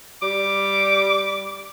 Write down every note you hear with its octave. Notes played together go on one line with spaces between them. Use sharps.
G3 D6